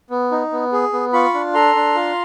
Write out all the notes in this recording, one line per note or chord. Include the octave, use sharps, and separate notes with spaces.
B3
D#4
B3
G#4
B3
F4 B5 C#6
D4
A4 A#5 C6
D4
F4